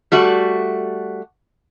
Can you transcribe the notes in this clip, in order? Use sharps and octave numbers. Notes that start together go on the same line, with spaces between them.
G3 A3 F#4